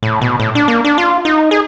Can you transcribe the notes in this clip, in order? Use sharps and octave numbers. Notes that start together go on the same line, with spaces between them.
A2
B2
A2
D4
A#3
D4
F4
D#4
G#4